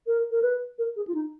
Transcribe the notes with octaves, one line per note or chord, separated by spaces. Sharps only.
A#4
A#4
B4
A#4
G#4
F4
D#4